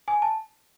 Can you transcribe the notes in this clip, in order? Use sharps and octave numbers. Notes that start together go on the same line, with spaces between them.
G#5
A5